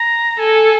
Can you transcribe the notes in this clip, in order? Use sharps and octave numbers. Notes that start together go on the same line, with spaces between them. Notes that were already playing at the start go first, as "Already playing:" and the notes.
Already playing: A#5
A4 G#5